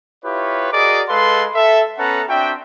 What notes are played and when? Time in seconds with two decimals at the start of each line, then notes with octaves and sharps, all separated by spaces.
0.24 E4 F4 G4 B4 C#5
0.72 F#4 G#4 A#4 D5 D#5 D6
1.09 G#3 A4 B4 F5 C6
1.54 A4 E5
1.98 B3 C#4 A4 B4 F#5 A#5
2.28 C4 D4 F#4 E5 G5